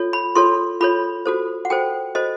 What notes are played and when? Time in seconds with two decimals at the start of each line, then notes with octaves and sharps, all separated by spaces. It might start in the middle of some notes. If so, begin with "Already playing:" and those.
Already playing: F4 A4 C#5
0.13 B5
0.35 F4 A4 C#5 C6
0.81 F4 A4 C#5 B5
1.26 F#4 A4 C5
1.65 F#5
1.70 F#4 A4 C5 G5
2.15 F#4 A4 C5 D#5